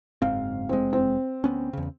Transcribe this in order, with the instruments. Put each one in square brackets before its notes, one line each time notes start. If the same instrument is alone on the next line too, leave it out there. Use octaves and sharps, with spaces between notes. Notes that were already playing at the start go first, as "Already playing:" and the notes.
[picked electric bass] F#1 G#2 C4 [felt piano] F5
[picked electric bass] F1 G#3 [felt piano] C4
[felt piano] C4
[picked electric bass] D2 B3 C#4
E2 C#3